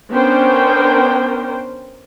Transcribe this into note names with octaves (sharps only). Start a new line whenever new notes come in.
B3 C#4 D4 A#4 C5 G5